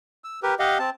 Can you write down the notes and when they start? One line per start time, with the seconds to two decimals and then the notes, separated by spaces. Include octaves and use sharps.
0.24 E6
0.43 G4 A#4 B4
0.59 G4 D#5 F5 F#5
0.79 C4 A5